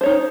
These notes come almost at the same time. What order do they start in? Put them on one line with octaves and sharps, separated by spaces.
C5 C#5 D#4